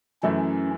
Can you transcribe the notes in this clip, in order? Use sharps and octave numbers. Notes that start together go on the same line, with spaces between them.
F#2 E3 A3 C#4 E4